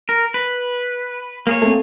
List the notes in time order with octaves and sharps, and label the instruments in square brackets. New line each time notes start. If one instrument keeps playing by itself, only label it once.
[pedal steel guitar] A#4
B4
A#3 G#4 C#5
[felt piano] A3 C4